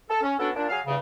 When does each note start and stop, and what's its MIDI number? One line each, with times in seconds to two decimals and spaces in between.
0.09 0.22 69
0.22 0.35 61
0.39 0.49 59
0.39 0.49 61
0.39 0.49 62
0.39 0.49 66
0.39 0.49 69
0.55 0.68 46
0.55 0.68 62
0.69 0.80 54
0.69 0.80 68
0.69 0.80 77
0.87 0.97 40
0.87 0.97 43
0.87 0.97 49